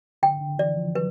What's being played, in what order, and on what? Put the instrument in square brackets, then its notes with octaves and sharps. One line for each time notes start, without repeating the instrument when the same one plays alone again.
[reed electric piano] D3 [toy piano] G5
[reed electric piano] D3
[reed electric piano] E3 [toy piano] D5
[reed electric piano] F3
[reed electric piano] F#3 [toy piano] B4